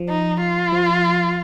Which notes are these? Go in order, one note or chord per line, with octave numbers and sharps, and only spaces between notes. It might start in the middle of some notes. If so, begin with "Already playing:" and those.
Already playing: F3
D#4
F4
F3